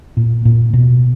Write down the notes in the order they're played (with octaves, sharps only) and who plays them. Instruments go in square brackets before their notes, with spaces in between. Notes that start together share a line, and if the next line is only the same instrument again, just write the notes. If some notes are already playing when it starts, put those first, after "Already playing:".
[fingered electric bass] A#2
A#2
B2